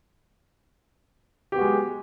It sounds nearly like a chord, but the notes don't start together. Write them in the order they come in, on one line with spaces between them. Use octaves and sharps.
G4 B3 F#4 G#3